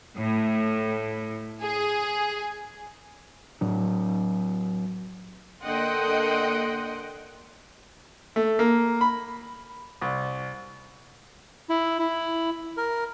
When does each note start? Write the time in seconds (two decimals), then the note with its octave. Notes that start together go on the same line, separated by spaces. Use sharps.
0.18 A2
1.63 G#4
3.61 A2 F#3 D4
5.63 D3 A#3 D#5 F#5 G5 C6
8.36 A3
8.59 A#3
9.01 B5
10.01 C2
11.69 E4
11.99 E4
12.77 A#4